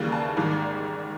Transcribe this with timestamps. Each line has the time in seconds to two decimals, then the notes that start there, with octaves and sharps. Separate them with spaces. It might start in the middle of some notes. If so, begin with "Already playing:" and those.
Already playing: D#2 C#3 E3 G3 A#3
0.12 A5
0.37 G#1 G#2 D#3 G3